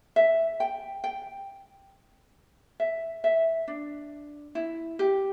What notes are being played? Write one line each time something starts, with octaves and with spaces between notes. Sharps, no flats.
E5
G5
G5
E5
E5
D4
E4
G4